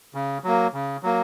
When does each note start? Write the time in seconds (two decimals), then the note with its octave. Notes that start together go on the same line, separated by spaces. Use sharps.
0.14 C#3
0.44 F#3 A#3
0.73 C#3
1.03 F#3 A#3